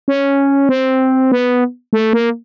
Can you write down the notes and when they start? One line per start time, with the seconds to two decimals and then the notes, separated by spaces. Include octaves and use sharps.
0.08 C#4
0.69 C4
1.32 B3
1.93 A3
2.13 A#3